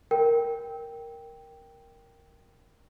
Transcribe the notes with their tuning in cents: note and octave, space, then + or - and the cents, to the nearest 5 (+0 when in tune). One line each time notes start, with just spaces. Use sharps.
A#4 +0 G5 +0